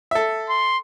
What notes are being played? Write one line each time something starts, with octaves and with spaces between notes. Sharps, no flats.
A4 E5
C6